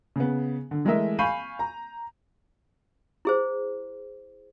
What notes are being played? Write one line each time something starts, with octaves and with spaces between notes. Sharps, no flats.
C#3 B3
D3
E3 G#3 A3 A#4 D#5 E5
F5 G#5 B5 C#6 G6 D#7
A#5
E4 G#4 C5